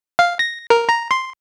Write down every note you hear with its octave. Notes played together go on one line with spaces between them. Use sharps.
F5
A#6
A#4
A#5
C6